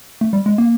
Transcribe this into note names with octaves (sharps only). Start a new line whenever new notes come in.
A3
G3
G#3
A#3